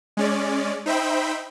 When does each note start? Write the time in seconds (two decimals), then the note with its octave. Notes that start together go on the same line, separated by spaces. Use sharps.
0.17 G#3 C#4 D5
0.86 D#4 C5 E5 G5 B5